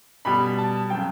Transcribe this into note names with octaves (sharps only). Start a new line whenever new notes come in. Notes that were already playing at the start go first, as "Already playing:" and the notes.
B2 G3 B5
A5
C#3 F#3 G5